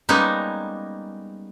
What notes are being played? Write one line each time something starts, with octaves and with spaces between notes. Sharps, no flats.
G3 G#3 A#3 B3 C#4 D#4